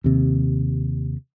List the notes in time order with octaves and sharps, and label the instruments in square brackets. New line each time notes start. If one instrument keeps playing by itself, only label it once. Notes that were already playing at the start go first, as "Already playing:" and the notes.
[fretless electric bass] D#2 C3